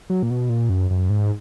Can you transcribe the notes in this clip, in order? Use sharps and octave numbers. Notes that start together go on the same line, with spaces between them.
F#3
A#2
B2
A#2
F#2
F#2
G#2